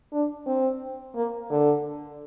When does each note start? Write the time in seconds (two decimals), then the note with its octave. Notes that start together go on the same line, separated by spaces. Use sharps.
0.12 D4
0.46 C4
1.15 A#3
1.50 D3